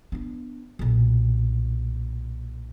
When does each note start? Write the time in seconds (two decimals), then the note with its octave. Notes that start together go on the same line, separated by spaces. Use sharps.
0.12 B3 D4
0.79 B1 A#2